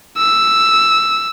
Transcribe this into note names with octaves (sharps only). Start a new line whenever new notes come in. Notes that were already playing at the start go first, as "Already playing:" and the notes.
E6